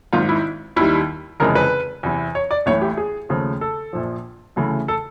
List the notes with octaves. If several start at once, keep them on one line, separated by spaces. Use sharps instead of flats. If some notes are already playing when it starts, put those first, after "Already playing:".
G#1 G#2 D#3 F4
E4
D#2 D#3 G3 E4
F1 F2 C#3 E3 G#3 A#4
B4
E2 C3 E3
C#5
D5
A1 A2 E3 C#5
G4
G#4
D#2 C#3 F3 A3
A4
A#1 A#2 F3
D2 C#3 E3 A3
A4